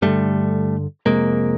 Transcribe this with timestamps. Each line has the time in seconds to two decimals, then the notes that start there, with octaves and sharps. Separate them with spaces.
0.02 G2 D3 G3 A3
1.06 F2 C3 G#3 A#3